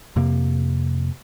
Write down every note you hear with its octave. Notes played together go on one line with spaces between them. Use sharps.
F2 C3 A#3